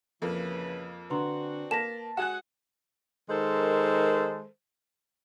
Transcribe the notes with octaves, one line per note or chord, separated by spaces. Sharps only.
F2 C#3 E3 A#3 B4
D3 C4 D4 F#4 B4 A#5 C6
A#3 A5 A#6 B6 E7
G#3 F#4 G#4 F#5 G#5 F#6 E7
D#3 G#3 A4 A#4 C5